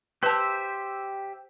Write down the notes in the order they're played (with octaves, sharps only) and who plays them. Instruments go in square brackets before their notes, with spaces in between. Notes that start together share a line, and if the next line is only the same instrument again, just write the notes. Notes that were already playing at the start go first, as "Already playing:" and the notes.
[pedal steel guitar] G4 C5 E5 [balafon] B4 A5